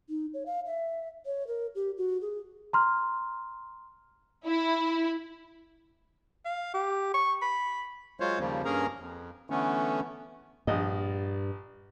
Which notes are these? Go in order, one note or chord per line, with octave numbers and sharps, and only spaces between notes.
D#4
C#5
F5
E5
C#5
A#4
G4
F#4
G#4
A#5 C6 F6
E4
F5
G4
C#6
B5
F#3 G#3 F4 C5 C#5
D#2 C#3 F3 G3 A#3
G2 A#3 C#4 G#4 A#4 A#5
F2
D3 E3 A3 B3 C#4
A#1 G2 D#5